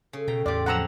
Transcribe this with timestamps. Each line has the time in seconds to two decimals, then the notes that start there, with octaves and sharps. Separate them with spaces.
0.13 C#3 A4
0.28 B2 G5 A#5
0.46 E2 A2 F4 G4 D5
0.66 F2 F3 F#3 F#5 A#5 E6